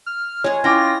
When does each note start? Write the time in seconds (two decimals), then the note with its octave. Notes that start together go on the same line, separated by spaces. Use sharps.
0.06 F6
0.44 G#3 G#4 C#5
0.64 C#4 E4 F4 G5 D6 A#6